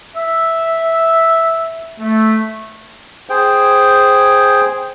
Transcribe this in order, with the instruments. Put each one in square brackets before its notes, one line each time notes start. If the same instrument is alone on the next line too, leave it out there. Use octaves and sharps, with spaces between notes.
[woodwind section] E5
A3
[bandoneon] G#4 C5 G5